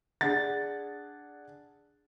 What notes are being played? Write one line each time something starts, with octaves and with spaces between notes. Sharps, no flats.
D4 G#4 F#5 A6